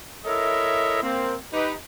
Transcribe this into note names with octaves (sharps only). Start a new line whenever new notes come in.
E4 A4 A#4 C#5 D#5 E5
A#3 C4
D#4 G4 B4